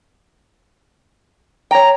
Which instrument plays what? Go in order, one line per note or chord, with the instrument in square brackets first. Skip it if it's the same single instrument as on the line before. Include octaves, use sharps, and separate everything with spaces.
[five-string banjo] C#5 G5 [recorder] A#5